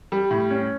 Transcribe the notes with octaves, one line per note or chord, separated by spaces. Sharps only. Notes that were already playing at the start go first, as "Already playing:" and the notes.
G3
A2
C#4